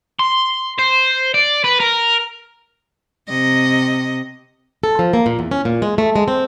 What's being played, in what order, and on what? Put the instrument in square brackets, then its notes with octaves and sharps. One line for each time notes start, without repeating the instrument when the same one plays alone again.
[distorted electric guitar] C6
C5
D5
B4
A#4
[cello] C3 D#5
[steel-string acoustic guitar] A4
F3
A#3
A#2
E2
C#4
A#2
G#3
A3
G#3
C4